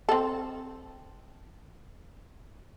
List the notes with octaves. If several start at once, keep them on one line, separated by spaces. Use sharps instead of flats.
C4 A4